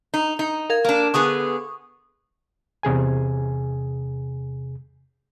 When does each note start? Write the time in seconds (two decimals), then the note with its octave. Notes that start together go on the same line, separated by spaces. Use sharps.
0.14 D#4
0.39 D#4
0.70 A#4 F5 G#6
0.85 A#3 D4
1.14 D3 B3 G#4 C#6 D#6
2.83 E2 C3 G#4 G#5